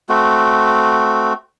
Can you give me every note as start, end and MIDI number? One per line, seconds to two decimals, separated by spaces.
0.09 1.33 57
0.09 1.33 60
0.09 1.33 66